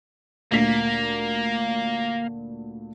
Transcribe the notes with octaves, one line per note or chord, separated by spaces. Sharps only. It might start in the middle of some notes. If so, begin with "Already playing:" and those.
D2 A#2 A#3 B6